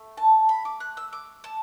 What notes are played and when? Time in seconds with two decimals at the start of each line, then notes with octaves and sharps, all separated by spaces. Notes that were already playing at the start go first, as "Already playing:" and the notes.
Already playing: A3
0.17 A5
0.49 B5
0.65 D6
0.80 F#6
0.97 E6
1.13 D6
1.44 A5